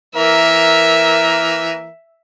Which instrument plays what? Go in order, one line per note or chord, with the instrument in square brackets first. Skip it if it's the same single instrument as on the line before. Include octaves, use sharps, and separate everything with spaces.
[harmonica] E3 A#3 A#4 [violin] E5